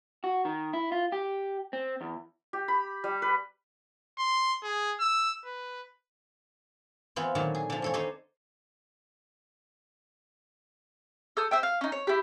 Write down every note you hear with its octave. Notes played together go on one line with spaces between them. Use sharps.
F#4
D#3
E4
F4
G4
C4
E2
G4
B5
G3
B4
C6
G#4
E6
B4
E3 B3 C4 F4
A#2 D3 D#3 F#3
G#4
D3 F3
E2 A4 C#5
D4 D#4 A4 C5 C#5 D#5
A4 D#6 G6
C5 E5 G5
F5
C#4 D#4
C#5
E4 G4